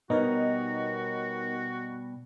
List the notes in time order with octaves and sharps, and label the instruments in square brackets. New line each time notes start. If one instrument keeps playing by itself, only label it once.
[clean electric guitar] B2 G3 [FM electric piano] B3 A#4 C#5 [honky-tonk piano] D#4 [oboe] F#4